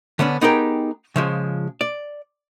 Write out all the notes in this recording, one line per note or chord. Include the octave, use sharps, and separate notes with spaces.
D3 B3 C#4 D4
B3 D#4 G4 G#4 A#4 G5
C#3 F3 G#3
D5